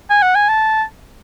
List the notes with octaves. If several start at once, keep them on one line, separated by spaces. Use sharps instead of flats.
G#5
F#5
G#5
A5